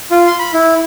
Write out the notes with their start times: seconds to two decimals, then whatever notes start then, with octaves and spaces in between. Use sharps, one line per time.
0.11 F4
0.27 C6
0.39 B5
0.54 E4